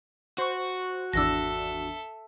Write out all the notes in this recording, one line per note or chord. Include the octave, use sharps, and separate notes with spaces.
F#4 C5 C#6
G#1 E2 D4 A4 E5 E6 A#6